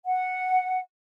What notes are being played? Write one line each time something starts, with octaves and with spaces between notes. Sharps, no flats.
F#5